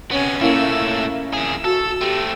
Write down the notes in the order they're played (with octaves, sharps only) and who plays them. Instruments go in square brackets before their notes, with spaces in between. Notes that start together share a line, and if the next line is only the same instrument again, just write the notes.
[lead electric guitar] C3 B3 [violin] C#4 G#5
[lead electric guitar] A#2 A3 [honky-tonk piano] A#3 C#4 E4 [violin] E6
[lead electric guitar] F2 G#4 [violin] E6
[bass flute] F#4 [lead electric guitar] A4
[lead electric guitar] A3 C4 [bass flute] G4